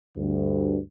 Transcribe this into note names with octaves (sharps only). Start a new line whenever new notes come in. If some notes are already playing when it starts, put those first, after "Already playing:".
D2 G2